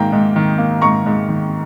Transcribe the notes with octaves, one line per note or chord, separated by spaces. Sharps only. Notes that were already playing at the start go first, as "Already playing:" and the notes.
Already playing: G#2 D#3 A#3 G5 A#5
G#2
D#3
A#3
G#2 A#5 C#6
G#2
D#3